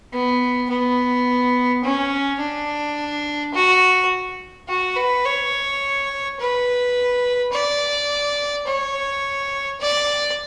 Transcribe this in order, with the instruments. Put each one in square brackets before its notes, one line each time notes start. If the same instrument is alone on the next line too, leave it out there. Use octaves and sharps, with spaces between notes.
[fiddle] B3
B3
C#4
D4
F#4
F#4
B4
C#5
B4
D5
C#5
D5